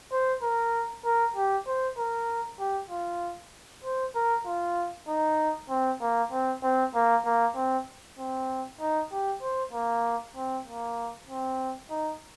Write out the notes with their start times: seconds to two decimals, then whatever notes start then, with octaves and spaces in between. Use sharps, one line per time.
0.12 C5
0.42 A#4
1.04 A#4
1.36 G4
1.67 C5
1.98 A#4
2.59 G4
2.90 F4
3.84 C5
4.15 A#4
4.46 F4
5.08 D#4
5.69 C4
6.01 A#3
6.32 C4
6.63 C4
6.95 A#3
7.25 A#3
7.56 C4
8.18 C4
8.80 D#4
9.12 G4
9.42 C5
9.73 A#3
10.36 C4
10.67 A#3
11.29 C4
11.90 D#4